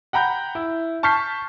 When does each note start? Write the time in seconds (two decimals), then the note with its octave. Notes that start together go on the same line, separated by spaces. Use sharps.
0.13 F#5 G5 A#5 B5 G6
0.55 E4
1.03 A5 C#6 F6 G6 B6 C7